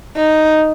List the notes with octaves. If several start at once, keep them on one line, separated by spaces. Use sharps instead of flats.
D#4